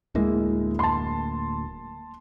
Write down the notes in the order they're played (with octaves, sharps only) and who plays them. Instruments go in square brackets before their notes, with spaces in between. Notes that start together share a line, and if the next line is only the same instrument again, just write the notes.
[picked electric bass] D1 D2 A#3 [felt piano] G#3 E4
[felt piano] A5 C6